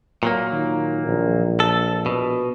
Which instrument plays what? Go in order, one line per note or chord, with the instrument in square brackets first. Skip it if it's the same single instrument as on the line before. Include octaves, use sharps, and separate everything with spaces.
[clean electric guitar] A#2 F#3 A#3
[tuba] D#3
A#1
[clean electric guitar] A4
B2